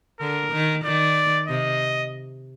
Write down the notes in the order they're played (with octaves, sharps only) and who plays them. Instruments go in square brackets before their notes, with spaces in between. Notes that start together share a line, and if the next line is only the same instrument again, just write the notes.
[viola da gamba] D3 [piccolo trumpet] A#4
[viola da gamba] D#3
[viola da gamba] D#3 [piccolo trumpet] D5
[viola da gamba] C3 [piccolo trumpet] D#5